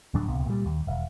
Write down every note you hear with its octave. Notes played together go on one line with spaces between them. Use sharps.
D1 A2 F#3 D4
D#1 C#2 C3 B3
A#2 G3
D#2
E1